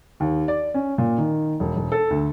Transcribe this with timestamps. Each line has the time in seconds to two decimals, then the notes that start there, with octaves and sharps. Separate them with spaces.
0.20 D#2
0.48 D5
0.74 C#4
0.98 A#2
1.18 D#3
1.60 E1
1.76 E1
1.92 A4
2.10 D2